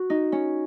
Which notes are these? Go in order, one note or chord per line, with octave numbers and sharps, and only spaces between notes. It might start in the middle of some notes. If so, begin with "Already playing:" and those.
Already playing: F#4
D#4
C#4